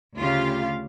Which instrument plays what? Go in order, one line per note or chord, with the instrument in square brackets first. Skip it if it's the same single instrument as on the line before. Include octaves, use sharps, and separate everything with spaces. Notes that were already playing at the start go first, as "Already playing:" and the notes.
[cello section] D2 C#3 F4 G4 F5